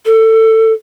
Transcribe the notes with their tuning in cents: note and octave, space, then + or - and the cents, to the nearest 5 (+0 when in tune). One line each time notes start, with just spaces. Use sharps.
A4 +20